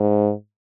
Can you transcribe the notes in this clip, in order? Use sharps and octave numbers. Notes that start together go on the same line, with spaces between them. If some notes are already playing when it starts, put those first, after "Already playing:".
Already playing: G#2